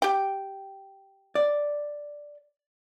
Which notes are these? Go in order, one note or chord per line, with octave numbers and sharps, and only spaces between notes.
G4 G5
D5